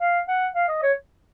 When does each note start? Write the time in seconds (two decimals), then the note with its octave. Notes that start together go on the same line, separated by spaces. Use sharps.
0.01 F5
0.28 F#5
0.55 F5
0.69 D#5
0.83 C#5